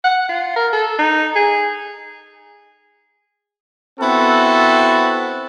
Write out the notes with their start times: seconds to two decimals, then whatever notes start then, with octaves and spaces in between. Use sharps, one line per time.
0.04 F#5
0.29 F4
0.56 A#4
0.73 A4
0.98 D#4
1.36 G#4
4.00 B3 C4 E4 F#4 A4